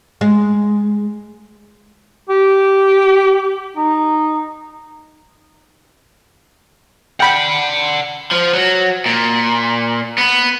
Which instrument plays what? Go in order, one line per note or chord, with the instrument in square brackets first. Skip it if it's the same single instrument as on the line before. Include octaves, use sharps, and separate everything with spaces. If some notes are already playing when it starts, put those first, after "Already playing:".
[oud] G#3
[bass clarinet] G4
D#4
[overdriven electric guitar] D5 F#5 [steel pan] G5 B5
[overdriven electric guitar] F3
F#3
A#2
B3